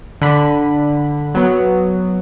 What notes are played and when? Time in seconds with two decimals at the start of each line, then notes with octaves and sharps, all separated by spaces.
0.22 D3 B5
1.34 F#3 B3